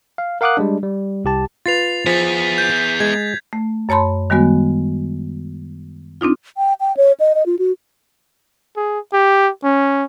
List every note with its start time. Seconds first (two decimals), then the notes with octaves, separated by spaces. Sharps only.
0.18 F5
0.41 A#4 F5 F#5 D6 D#6 F#6
0.57 G3 G#3 D4
0.83 G3
1.25 C2 G4 A5
1.66 F4 B4 A6 C7 F7
2.06 F3 B3 G#4 A6 B6
2.58 G6
3.00 G#3 G#6
3.53 A3
3.89 F#2 C#5 A5 B5 C6
4.30 D#3 G3 G#3 B3 F#4
6.21 C4 D4 D#4 F4
6.57 G5
6.80 G5
6.97 C#5
7.20 D#5
7.35 D#5
7.46 F4
7.59 F#4
8.77 G#4
9.13 G4
9.64 C#4